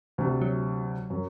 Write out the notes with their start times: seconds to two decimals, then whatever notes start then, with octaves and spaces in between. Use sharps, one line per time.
0.18 D2 C3
0.42 F#3
1.10 F#2